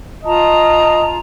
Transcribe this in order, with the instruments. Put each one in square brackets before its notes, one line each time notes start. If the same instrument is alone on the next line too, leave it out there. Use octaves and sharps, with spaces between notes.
[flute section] F4 A5 A#5 [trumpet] D#5